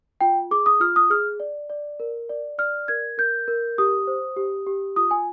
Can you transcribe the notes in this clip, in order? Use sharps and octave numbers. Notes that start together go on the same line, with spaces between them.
F4 G5
G#4 D6
D#6
F4 F6
D#6
G#4 F6
D5
D5
A#4
D5
D5 F6
A#4 G#6
A#4 G6
A#4
G4 D#6
C5
G4
G4
F4 D#6
G#5